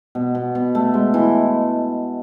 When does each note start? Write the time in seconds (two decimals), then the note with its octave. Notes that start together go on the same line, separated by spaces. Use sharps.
0.15 B2
0.35 B2
0.55 B2
0.75 A3
0.94 G#3
1.14 E3